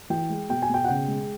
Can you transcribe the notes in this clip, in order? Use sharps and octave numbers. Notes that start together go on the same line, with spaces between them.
E3 G5
G#3
B2 G5
G#5
B2 G5
F#5
C#3 G5
G#3